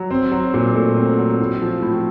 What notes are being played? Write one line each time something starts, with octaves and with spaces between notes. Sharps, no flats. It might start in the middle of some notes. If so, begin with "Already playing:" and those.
Already playing: F#3
C4
F#3
A#2
A3
C4
F#3
A2
F3
A2